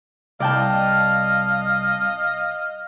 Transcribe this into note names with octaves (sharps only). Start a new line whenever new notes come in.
C2 D5 D#5 F5 G5 A5